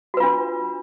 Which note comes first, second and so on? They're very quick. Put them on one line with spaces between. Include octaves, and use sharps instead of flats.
F#4 B4 F4 D4